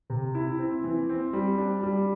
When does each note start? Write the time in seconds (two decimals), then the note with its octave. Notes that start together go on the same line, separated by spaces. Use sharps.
0.10 C3
0.35 E4
0.59 C4
0.84 E3
1.09 C4
1.33 G3
1.58 D4
1.83 G3